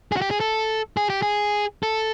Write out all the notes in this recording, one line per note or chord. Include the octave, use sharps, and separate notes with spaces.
G#4
F#4
G4
G#4
A4
G#4
G4
G#4
A4